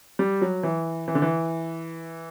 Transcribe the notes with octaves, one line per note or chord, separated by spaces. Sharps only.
G3
F#3
E3
E3
D3
E3